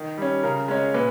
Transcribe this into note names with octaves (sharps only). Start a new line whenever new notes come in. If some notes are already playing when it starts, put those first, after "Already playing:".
Already playing: D#3
G3 C#4
C#3 A#4
G#3 C#4
A#2 B4